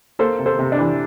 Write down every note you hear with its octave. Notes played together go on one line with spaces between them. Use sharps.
A#3 A4 C5
C3
A4 C5
C3
D4
E3